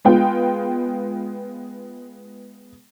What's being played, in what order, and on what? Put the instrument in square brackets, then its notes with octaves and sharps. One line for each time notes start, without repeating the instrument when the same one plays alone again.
[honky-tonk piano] G#3 B3 F4 G5